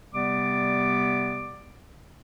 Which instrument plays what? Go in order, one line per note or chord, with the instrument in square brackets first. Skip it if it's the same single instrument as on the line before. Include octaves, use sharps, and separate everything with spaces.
[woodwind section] C3 G3 B3 D5 D6